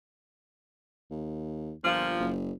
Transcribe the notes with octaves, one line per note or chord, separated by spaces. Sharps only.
D#2
G1 A#2 F3
F#1